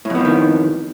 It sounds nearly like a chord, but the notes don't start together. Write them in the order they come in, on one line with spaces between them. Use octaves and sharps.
A2 F2 B3 F3 D#3